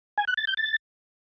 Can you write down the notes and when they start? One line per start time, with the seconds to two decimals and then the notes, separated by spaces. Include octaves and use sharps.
0.18 G#5
0.28 F#6
0.37 A6
0.47 G6
0.57 A6